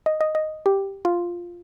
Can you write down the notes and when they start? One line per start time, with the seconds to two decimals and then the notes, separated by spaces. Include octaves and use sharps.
0.06 D#5
0.21 D#5
0.35 D#5
0.66 G4
1.05 F4